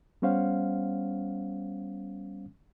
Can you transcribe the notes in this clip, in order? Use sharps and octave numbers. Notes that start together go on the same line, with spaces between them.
G3 B3 C#4 C5 F5 F#5